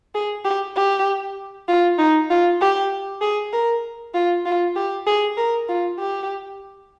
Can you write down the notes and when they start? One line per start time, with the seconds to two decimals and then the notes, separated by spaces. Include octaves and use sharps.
0.15 G#4
0.45 G4
0.76 G4
1.68 F4
1.98 D#4
2.30 F4
2.61 G4
3.22 G#4
3.53 A#4
4.14 F4
4.46 F4
4.76 G4
5.07 G#4
5.37 A#4
5.69 F4
5.99 G4